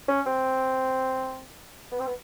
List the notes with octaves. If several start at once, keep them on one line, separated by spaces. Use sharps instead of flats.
C#4
C4
B3
C4
B3